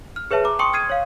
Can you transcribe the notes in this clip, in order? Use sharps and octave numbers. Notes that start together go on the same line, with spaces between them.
F6
G#4 B4 C#5 E5 A5
A#5 D6
G5 A5 C6 C#6 D#6 C#7
D#6 F6 G#6 C7 D#7
C#5 F5